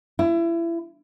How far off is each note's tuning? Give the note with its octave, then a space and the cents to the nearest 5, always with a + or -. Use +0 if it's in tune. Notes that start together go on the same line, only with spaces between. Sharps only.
E4 +30